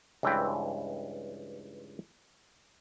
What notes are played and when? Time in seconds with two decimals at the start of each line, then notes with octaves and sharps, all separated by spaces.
0.23 C#2 G2 E3 C4 B4 G5